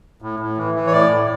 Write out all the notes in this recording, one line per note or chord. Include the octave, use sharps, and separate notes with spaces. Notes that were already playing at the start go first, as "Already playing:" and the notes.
A2
A2
E3
E3
C#5
A2 D5
A2